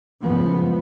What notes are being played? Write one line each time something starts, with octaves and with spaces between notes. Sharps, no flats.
C#2 F#2 A2 E3 F3 B3